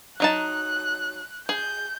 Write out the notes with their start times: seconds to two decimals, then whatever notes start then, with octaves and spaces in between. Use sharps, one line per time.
0.20 F#3 D#4 A5 F#6
1.49 G#4 G6